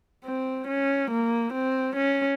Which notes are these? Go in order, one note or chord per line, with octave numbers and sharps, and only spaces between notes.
C4
C#4
A#3
C4
C#4